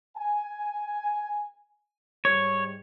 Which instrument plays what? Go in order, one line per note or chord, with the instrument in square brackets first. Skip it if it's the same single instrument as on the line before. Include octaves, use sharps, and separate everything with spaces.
[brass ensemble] G#5
[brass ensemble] G#2 G3 [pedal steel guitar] C#5